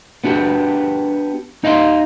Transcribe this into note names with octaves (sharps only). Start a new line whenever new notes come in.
B3 D4 F#4 G4
D#4 D#5 F5 B5 C6